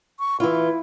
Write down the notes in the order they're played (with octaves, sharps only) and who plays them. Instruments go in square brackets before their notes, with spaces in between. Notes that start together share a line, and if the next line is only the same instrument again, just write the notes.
[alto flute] C#6
[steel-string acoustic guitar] E3 F4 [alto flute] E4